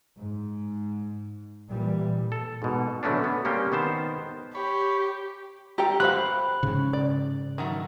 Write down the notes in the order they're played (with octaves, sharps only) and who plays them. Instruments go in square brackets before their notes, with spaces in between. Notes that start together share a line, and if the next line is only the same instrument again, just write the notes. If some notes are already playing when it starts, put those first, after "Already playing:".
[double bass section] G#2
A#2 E3 G3
[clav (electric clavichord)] A4
G#2 B2
D3 F#3 A3 B3 C#4 D4
B3
G3 A#3 C4 C#4 G4 G5
D#3 B3 C5 A5
[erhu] G4 [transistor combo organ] C#5 B5
[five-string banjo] G3 A4 G5 [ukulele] G4 A#5
[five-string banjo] F#4 C5 F5 [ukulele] B5 [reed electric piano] F#6
[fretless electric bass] G#2 C#3
[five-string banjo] D5
D#3 F#3 A3